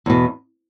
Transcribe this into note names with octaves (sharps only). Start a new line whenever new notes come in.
E2 B2